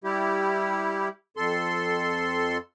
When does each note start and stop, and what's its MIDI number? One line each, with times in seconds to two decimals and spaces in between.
0.04 1.08 55
0.04 1.08 64
0.04 1.08 67
1.37 2.58 41
1.37 2.58 69
1.37 2.58 84